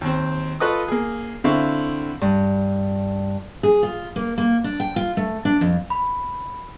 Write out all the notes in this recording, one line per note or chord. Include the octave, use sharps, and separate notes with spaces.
D#2 C4
F4 A4 B4 D#5 C#6 D#6
A#3 G#4
D3 C4 E4 E5 F5 C#6
G2
G#4
F4
A#3
A#3
D4
G5
F4
A3
D4
F2
B5